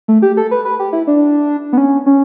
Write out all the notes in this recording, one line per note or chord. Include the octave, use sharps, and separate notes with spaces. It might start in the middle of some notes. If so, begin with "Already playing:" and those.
A3
G4
A4
B4
B4
G4
E4
D4
B3
C#4
C#4